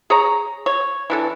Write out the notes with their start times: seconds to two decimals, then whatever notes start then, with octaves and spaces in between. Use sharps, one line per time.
0.10 G#4 C#5 A#5
0.66 C#5
1.10 E3 D4 A4